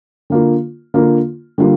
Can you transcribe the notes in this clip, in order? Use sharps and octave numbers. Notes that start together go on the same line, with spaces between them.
D3 A#3 F4
D3 A#3 F4
D3 G3 A#3 F4